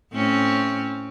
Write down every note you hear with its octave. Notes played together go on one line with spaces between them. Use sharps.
A2 C4 C#4